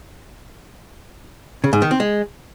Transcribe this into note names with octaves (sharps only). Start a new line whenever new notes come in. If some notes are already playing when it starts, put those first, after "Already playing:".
C#3
G#2
D#3
C4
G#3